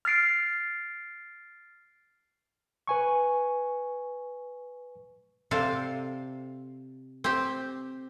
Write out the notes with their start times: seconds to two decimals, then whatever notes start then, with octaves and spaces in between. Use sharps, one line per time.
0.05 F6 A6 C7 D7
2.87 B4 G#5 C#6
5.51 C3 C4 A4 D5 F5
7.24 C4 G4